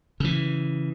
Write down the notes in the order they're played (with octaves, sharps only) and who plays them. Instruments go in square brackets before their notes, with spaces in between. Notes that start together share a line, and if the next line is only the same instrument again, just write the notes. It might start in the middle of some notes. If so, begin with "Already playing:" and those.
[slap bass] C#3 E3